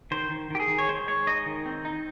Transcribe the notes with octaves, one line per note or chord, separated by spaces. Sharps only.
D#3 C5
D#3
D#3 G4
G#4
D#3
C#5
G#3 C5
G#3 C#5
D#4 D#5
D#3
C4
D#4